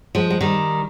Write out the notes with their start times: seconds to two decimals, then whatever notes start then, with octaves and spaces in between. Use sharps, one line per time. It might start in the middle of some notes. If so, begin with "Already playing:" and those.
0.15 F3 G#3
0.30 G#3
0.41 D#3 G3